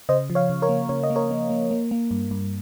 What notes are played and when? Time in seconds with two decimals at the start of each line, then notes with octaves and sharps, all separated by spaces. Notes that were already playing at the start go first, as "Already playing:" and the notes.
0.09 C#3 C5 D#5
0.30 F3
0.35 C#5 F5
0.50 C#3
0.62 A#4 C#5
0.69 A#3
0.89 C#3 C#5
1.03 D#5
1.10 A#3
1.16 A#4 C#5
1.31 A#3
1.50 A#3
1.71 A#3
1.91 A#3
2.11 G2
2.31 G2